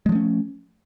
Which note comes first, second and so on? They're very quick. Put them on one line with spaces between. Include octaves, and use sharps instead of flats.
G#3 F3 A3 C#4